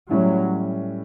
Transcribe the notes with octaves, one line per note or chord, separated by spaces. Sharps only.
A2 F#3 G3 C#4 E4